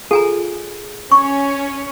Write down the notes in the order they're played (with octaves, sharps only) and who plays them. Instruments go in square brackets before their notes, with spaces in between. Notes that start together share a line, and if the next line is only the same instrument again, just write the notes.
[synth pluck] F4 G#4 [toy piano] A4 G#5 A#5
[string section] C#4 [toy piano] C#6